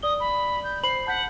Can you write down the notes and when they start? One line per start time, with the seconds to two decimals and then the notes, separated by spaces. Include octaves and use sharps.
0.03 D5 D#6 G7
0.20 B5
0.63 G6
0.83 C5 B5 C7 F#7
1.07 F#5 A5 G6 B6